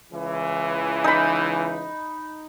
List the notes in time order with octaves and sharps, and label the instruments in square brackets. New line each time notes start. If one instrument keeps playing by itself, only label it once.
[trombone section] C#2 E3
[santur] D#4 B5